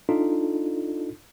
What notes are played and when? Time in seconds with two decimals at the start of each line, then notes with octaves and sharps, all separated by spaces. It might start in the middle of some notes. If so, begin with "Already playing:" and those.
0.09 D4 D#4 F4 A4